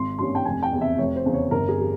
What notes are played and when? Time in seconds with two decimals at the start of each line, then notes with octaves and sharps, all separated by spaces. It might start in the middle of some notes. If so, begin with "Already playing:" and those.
Already playing: G#1 C6
0.19 G2 G3 A#3 C#4 C6
0.35 G5
0.45 F1 G#5
0.63 G5
0.73 E2 C3
0.81 E5
0.98 F1 C#5
1.16 C5
1.26 E2 C#3
1.34 C#5
1.51 G1 A#4
1.69 G#4
1.79 G3